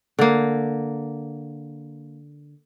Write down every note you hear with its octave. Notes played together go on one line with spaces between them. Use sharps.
D3 A#3